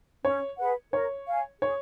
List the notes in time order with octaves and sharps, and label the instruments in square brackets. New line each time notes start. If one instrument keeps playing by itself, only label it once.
[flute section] C#4 [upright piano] C#5
[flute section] G#4 B4 F#5
[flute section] A#4 [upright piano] C#5
[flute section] F5 G#5
[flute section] G#4 [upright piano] C#5